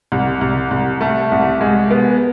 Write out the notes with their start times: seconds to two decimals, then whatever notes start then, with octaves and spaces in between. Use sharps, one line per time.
0.12 C2
0.41 C2
0.71 C2
1.01 A3
1.32 C2
1.61 G#3
1.91 B3